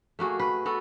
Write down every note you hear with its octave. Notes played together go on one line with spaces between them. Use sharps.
A3 A#3 F#4 G#4
B4
B3 F#4 A4